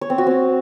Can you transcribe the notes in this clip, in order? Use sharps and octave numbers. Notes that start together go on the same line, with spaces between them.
C#5
C4
F#4
C4